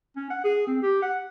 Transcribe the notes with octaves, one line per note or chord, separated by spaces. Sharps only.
C#4
F#5
G#4
C4
G4
F#5